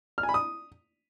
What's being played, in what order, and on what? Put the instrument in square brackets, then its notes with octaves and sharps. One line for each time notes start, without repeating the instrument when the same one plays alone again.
[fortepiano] F6
G#5
B5
D#6